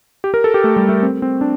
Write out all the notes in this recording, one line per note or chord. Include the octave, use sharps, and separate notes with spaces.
G4
A#4
A4
G4
A3
G3
A3
C4
C4
D4